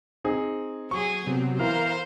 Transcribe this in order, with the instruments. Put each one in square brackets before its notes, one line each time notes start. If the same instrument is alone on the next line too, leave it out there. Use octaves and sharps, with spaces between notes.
[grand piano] C4 D#4 G#4
[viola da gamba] F#3 G#4 [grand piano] C#6
[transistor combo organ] C3 F#3 [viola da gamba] B3 C4
[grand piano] E3 [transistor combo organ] A#4 F5 [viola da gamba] C5